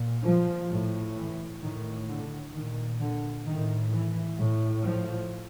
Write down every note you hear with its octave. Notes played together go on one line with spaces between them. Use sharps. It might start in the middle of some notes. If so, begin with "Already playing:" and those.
Already playing: A#2
F3
A2
E3
A2 D#3
D3
A#2 D#3
D3
A2 D#3
E3
A2
F3